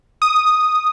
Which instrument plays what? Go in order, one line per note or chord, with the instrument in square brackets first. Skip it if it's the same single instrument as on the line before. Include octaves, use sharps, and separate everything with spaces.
[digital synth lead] D#6